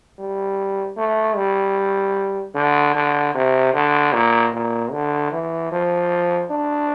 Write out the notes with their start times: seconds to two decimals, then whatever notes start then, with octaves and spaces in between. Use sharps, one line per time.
0.19 G3
0.97 A3
1.36 G3
2.55 D3
2.95 D3
3.35 C3
3.74 D3
4.13 A#2
4.53 A#2
4.92 D3
5.32 E3
5.72 F3
6.51 D4